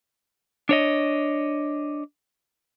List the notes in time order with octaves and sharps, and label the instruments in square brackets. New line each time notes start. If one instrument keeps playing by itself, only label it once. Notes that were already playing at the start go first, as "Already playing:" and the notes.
[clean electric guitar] D4 C#5 D#5